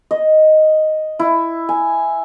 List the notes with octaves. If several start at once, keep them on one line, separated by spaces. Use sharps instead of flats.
D#5
E4
G#5